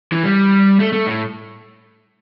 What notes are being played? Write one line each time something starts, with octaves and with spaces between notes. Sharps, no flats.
E3
G3
A3
A3
A2